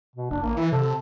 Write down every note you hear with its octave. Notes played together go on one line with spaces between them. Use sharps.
B2
F#1 D4
A1 A#3
E3 E4
C3 A4